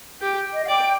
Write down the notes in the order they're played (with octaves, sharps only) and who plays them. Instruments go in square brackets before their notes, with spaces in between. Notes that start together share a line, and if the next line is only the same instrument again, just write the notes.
[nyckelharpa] G4 [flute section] G5
[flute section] D#5
F5
[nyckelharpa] D5 [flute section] G5